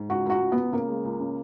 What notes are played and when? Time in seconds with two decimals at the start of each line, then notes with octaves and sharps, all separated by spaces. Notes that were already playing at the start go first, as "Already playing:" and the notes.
Already playing: G#2
0.09 C#2 F#4
0.25 C#2 F#4
0.41 C#2
0.52 C#2 B3
0.73 C#3 A#3
0.89 G#3
1.04 C#2
1.20 C#3